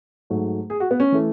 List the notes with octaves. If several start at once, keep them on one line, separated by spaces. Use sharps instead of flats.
G#2 F#3 A3
G#4
F#4
B3
C#4
E3 A3